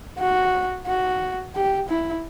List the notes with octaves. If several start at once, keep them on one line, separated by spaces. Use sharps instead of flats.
F#4
F#4
G4
E4